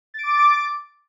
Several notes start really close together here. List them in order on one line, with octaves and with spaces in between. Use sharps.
A6 D7 D6